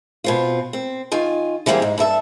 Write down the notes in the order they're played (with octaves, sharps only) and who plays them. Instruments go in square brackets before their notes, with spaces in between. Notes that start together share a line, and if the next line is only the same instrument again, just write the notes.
[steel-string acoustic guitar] B2 C4 F4
C4
D#3 F4 G#5
D3 E3 G3 A#3 C4 G#4
G#2
G2 A4 E5 A5